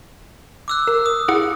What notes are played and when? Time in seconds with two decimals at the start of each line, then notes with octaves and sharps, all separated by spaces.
0.68 D6 E6 F#6
0.87 A#4
1.06 D#6
1.28 E4 G#4 F#5